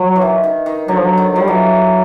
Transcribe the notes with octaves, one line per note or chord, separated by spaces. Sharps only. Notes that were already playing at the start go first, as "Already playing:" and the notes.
Already playing: F#3
E3
D#3
D#3
D#3
D3 F#3
F3
F#3
D#3
F#3
F3 G3
E3 F#3